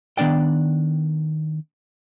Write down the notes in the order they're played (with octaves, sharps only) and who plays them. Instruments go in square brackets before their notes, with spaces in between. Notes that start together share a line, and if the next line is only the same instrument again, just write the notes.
[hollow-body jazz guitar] D#3 B3 D4 D5 G5